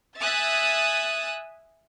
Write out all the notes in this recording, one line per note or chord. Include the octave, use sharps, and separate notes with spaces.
E5 G#5 D#6 F#6 A6